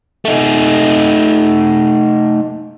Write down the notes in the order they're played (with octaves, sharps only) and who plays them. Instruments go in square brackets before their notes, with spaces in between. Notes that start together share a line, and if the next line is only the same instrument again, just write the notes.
[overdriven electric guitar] A3 D#4